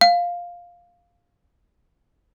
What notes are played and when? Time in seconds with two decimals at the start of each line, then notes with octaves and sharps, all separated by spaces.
0.01 F5